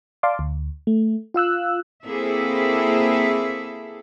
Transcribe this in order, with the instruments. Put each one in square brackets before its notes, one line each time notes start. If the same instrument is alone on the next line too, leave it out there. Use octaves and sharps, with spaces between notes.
[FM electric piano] D5 F5 A5 C6 D6
D2
A3
F4 F5 E6 F#6
[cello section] A#3 C4 E4 G#4 A4 E5